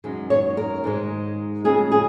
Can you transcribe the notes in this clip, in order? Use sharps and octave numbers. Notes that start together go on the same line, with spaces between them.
F#2 D#3 G#3
C#5
A#4
G#2 D#3 G#3
F2 C#3 G#3 G#4
G#4